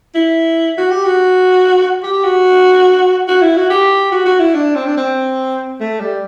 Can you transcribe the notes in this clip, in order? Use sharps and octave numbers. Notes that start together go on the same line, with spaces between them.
E4
F#4
G4
F#4
G4
F#4
F#4
E4
F#4
G4
F#4
F#4
E4
D4
C4
D4
C4
A3
G3